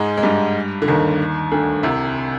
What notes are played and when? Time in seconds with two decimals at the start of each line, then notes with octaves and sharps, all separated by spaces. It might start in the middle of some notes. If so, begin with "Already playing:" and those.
Already playing: G#2 G#3
0.17 G#3
0.23 G2 G3
0.82 D3
0.88 D#2 D#3
1.52 D2 D3
1.83 C2 C3